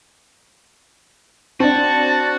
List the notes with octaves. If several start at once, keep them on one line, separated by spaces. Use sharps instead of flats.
C4 D4 F#4 A5